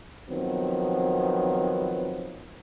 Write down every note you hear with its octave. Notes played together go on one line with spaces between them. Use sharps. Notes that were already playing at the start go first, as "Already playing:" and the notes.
D#3 F3 F#3 B3 C4